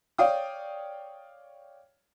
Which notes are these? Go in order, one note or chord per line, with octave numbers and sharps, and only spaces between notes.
C#5 D5 F5 G5 D#6